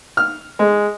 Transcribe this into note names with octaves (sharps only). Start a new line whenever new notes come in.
F6
G#3